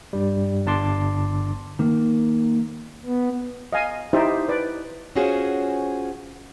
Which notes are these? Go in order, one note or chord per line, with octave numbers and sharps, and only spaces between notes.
G2 G3
G1 D4 A5 C6 D6
D#3 A#3
B3
D#5 F5 G#5
D#4 E4 G4 C5 D5 E5
B4 D5
C#4 F4 F#4 G#4 C5 C#5